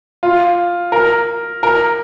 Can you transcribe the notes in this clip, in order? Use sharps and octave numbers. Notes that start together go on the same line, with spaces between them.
F4
A#4
A#4